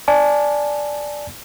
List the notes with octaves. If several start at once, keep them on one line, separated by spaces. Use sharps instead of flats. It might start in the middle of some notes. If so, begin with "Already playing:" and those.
D5 G#5 A5